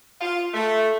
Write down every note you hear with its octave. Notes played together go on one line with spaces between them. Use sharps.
F4
A3